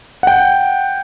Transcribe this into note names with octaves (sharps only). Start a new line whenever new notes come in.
F#5 G5